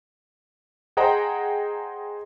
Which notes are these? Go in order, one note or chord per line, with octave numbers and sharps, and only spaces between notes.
G#4 C5 D#5 F#5 G5 A#5